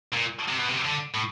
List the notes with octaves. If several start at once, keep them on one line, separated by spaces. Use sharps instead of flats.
A#2
C3
B2
C3
D3
A2